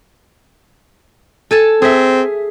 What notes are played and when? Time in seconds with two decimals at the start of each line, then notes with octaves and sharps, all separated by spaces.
1.51 A4 G#5 A5
1.82 C4 G#4 E5